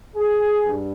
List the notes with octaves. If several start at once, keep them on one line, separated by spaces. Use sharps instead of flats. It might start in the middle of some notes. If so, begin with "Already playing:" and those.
G#4
G2